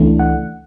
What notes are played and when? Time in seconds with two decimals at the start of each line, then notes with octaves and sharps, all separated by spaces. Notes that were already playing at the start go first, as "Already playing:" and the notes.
Already playing: C#2 C#3 E3 A3 D4
0.19 F#5